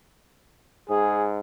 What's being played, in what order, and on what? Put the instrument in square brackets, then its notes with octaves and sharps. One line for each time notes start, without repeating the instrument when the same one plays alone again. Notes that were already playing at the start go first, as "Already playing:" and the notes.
[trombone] G#2 [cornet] G#4